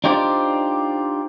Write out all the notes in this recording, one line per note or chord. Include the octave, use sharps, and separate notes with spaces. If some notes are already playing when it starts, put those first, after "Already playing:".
D4 D#4 F4 G4 C5 D5